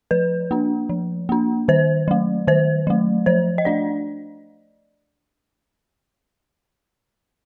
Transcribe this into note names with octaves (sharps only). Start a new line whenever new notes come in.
F3 B4
A#3 D4
F3
A#3 D4
D#3 C5
F#3 A3
D#3 C5
F#3 A3
F3 C5
D#5
A3 D4 D5